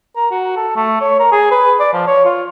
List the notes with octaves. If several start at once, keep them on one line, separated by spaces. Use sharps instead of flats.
A#4
F#4
A4
A3
C#5
A#4
G#4
B4
D5
F3
C#5
F4